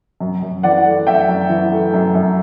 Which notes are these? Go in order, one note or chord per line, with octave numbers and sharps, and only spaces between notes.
F#2
F#2
E3 D5 F#5
A3
F#2 E5 G5
F#2
E3
A3
F#2
F#2